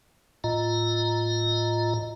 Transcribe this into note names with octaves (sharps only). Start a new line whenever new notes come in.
A2 F4 D#5 A#5